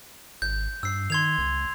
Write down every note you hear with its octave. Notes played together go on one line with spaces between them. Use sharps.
G#1 G6
G2 E6 C7
D#3 C6 G#6 F7
C#2